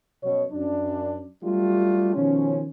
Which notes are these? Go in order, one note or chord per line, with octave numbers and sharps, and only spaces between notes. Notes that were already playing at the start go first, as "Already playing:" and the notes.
F#2 B2 C#5
F#2 D4
F#3 G3 A3 D4 F4 G4
B2 D#3 F3 C#4